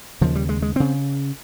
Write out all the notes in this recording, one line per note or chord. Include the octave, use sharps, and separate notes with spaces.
D#2 C#3 F3
G3
G#3
G#3
C#3 C4